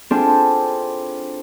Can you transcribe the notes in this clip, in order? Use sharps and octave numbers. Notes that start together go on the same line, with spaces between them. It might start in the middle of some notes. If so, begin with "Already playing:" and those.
C4 D4 E4 F4 G#4 A4